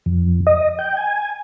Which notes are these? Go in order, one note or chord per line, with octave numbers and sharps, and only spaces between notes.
F2
D#5
G5
G#5